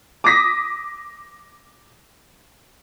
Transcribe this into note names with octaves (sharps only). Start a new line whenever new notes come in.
D6 D#6 A#6 B6